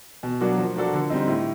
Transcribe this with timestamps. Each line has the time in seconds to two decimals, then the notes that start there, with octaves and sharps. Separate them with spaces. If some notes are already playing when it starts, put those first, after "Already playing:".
0.23 B2
0.41 F#3 A#3 D4 F#4
0.58 F3
0.76 A#3 D4 F#4 A4
0.94 D3
1.10 G3 C4 D#4
1.28 A2